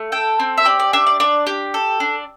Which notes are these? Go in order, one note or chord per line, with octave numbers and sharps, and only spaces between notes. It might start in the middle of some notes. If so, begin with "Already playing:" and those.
Already playing: A3
A4 G5
C4
E5
G4 D5
D5
D4 E5
D5
D4 D5
G4
A4
D4